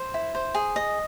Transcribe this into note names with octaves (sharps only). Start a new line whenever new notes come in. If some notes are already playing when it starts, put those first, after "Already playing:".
Already playing: C5
E4
C5
G#4
D#5